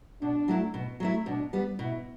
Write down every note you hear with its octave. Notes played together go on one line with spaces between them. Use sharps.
B2 D4
F#3 A3 E4
B2
F#3 A3 E4
B2 D4
G3 B3
B2 E4